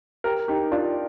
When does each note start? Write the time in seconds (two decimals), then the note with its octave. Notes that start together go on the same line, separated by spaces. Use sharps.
0.24 G4 A#4
0.48 D#4 G4
0.71 D4 F4